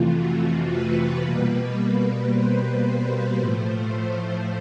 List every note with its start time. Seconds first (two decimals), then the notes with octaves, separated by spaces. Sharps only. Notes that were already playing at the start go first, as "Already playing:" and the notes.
Already playing: F2 C3 E3 A3 F4
0.15 F#4
0.69 B4
1.23 B2 G3 A#3
2.31 C5
2.85 C5
3.39 A2 F3 A3